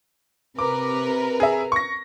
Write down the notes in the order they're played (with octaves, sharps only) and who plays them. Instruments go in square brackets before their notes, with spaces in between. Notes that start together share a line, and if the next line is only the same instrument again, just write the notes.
[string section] C3 A#4 B4 [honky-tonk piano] D6
[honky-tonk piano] G#4 E5
C#6 A#6